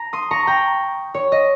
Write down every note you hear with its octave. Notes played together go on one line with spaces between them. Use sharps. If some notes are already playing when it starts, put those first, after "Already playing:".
Already playing: A#5
C6 D#6
A#5 C#6
G5 A#5
C#5
D#5